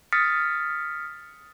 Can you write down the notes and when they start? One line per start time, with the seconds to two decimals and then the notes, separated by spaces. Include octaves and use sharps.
0.13 D#6 F6 A6 B6 C#7